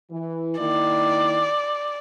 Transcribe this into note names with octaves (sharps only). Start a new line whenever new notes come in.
E3
D#3 A#3 E4 D5